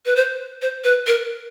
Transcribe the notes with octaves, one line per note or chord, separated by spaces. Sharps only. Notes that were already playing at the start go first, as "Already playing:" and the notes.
B4
C5
C5
B4
A#4